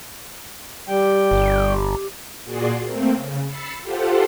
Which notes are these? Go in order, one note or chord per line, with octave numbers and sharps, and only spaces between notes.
G3 G4 G5
G1
A#2 F#4 G#4 D5 C6 C7
A3 A#3 C4
C#3
B5 E6 A6 C7 C#7
F4 G4 A4 C5 F#5